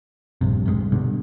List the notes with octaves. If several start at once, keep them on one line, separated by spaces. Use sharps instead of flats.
A#1 G2 C3
G2 C3 G3 G#3
G2 B2 D3